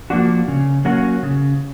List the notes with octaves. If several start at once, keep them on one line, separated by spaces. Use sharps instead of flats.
F3 A#3 D4 F#4
C#3
F#3 A#3 C#4 F#4
C#3